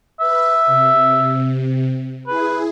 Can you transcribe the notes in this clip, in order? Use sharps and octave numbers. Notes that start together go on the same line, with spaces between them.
B4 E5
C3
E4 G#4 B4